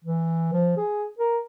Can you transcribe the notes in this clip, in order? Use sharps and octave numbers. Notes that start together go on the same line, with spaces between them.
E3
F3
G#4
A#4